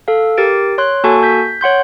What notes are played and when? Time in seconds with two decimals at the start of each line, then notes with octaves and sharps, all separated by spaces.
0.08 A4 F5
0.38 G4 A#4 A6 D7
0.78 C#5 C6 F#6
1.04 A#3 F#4 A4 G#5 A5 C#6
1.23 G6 B6
1.61 C#5 F#5 C6 G6